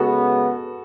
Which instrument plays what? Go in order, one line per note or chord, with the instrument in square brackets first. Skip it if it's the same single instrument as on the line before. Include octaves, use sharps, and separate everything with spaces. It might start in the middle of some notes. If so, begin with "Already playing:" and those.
Already playing: [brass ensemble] C#3 G#3 B3 [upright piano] F#4 A4